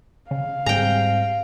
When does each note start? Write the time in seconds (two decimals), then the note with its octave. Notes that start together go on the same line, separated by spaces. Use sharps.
0.31 C#3 F5
0.66 G#2 G3 C4 G#4 G5 A#5